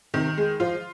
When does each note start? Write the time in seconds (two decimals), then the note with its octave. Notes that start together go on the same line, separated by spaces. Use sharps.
0.14 C3 D#3
0.38 G#3
0.60 F3 F4